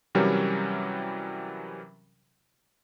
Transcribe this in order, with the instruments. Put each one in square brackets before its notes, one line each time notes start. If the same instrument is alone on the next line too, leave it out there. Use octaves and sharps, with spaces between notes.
[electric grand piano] C3 E3 F#3 G3 C#4 A#4